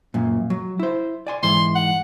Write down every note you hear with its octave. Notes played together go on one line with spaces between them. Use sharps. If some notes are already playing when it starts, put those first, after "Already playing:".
F#2 A#2
F#3
E4 C5
D5 G#5 C6
G#2 E3 C6
F#5